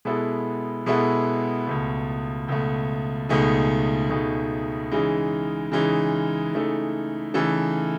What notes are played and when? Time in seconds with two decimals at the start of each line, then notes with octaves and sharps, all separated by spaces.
0.05 B2 G#3 B3 E4 A4
0.86 B2 G#3 B3 E4 A4
1.67 C#2 B2 A3
2.48 C#2 B2 A3
3.29 C#2 B2 A3 D#4 G#4
4.10 C#2 B2 A3 D#4 G#4
4.92 C#3 E3 G#3 D#4
5.72 C#3 E3 G#3 D#4
6.53 C#3 E3 A3 D#4 A4
7.34 C#3 E3 A3 D#4 A4